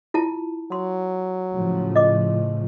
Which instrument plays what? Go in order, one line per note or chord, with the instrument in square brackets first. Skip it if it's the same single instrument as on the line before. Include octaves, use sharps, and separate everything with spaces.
[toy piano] E4 F4 A5
[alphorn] F#3 [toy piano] C6
[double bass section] A2 C#3 F3
[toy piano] D#5 D6